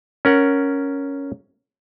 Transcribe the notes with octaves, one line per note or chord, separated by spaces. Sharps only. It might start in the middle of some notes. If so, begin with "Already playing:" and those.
C#4 A#4 F#5